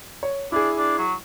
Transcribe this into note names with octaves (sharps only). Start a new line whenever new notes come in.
C#5
D4 E4 G#4
D4
F#3